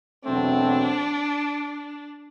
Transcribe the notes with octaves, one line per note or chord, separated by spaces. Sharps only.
E2 B2 F#3 A3 C4 D4